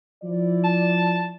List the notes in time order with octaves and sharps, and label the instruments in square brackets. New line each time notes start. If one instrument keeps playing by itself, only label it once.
[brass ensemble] F3 E4 D5
[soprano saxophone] A5